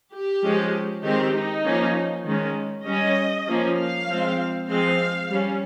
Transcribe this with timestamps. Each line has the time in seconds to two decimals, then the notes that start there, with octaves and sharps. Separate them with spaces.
0.13 G4
0.43 F3 G#3 C#4
1.03 D#3 G#3 C4 G4
1.35 D#4
1.65 F3 A#3 C#4
2.25 D#3 G#3 C#4
2.86 G3 C#4 D#5
3.47 F3 A#3 C#4
3.77 F5
4.08 F3 G#3 C4
4.68 F3 G#3 C4 F5
5.30 G3 C#4